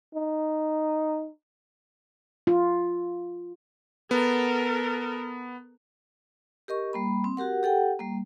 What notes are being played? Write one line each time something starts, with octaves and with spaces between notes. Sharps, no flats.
D#4
F4
B3 A4 A#4
G4 A#4 D#5 C#6
G3 A#3 B5
C4
F#4 G4 A#4 F#5
G4 A4 F#5 G5
G3 A#3